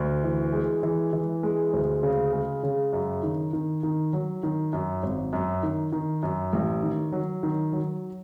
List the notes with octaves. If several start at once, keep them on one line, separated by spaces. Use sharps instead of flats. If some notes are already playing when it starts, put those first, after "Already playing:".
Already playing: D2
E3
G#3
E3
E3
G#3
D2
C#3
G#3
C#3
F#2
D#3
D#3
D#3
F#3
D#3
F#2
G#1
F#2
D#3
D#3
F#2
A1
D#3
F#3
D#3
F#3